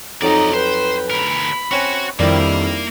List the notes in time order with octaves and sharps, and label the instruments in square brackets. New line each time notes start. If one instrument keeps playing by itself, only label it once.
[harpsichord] F2 F#3 [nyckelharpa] D#4 [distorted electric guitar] D5 D#5
[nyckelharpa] B4 G5 [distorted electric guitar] C5
[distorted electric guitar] D2 A#4 [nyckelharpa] B5
[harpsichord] C4 C#4 G#5 [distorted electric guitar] F#4
[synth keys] F2 D#3 G3 [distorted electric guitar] A#3 [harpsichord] D4 [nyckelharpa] E4